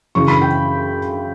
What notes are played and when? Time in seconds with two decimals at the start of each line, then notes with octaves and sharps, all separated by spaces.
0.15 F#2 C#3 E3 C#6
0.28 B5
0.42 G5